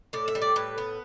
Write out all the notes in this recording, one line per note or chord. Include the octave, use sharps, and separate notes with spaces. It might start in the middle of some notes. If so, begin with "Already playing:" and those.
A2 D5
E5
G3
D5
A2 B4
B3